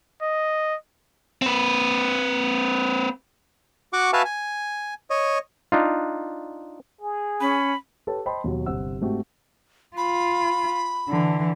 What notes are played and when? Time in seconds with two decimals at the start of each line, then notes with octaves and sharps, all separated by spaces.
0.23 D#5
1.42 C4 B4
3.93 F#4 F#5 C#6 D6
4.13 F#4 B4 E5 F5 G#5 A5
4.25 G#5
5.10 C#5 D#5
5.72 D4 D#4 F4
7.01 G#4
7.41 C#4 B5
8.07 G4 A4 B4 C#5 A5
8.26 C5 D#5 G5 A5 B5 C6
8.44 D#2 B2 F#3
8.66 G1 C3 C5 F#5 E6
9.01 G#2 A3 C4 F#4 G4
9.97 F4 B5
11.09 D3 E3